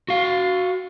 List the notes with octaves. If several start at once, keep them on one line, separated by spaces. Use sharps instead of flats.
F#4 F5